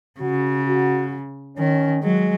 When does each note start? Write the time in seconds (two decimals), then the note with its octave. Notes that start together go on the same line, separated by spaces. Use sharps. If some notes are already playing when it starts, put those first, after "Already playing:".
0.20 C#3 F#4
0.66 F#4
1.57 D#3 C#4
2.03 F#3 G#3